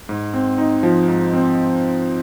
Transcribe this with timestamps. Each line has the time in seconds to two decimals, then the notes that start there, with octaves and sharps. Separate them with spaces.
0.09 G#2
0.34 C4
0.58 D#4
0.83 F3
1.08 G#2
1.34 C4